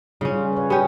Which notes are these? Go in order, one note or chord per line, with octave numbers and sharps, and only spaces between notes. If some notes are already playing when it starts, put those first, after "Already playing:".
C#3 G3 C#4 F4
B4 C#5
B3 C#4 G4 G5